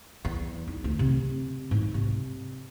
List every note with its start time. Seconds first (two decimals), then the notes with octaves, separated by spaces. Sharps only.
0.25 E2
0.68 D#4
0.84 D2
0.99 C3
1.71 G#2
1.94 C3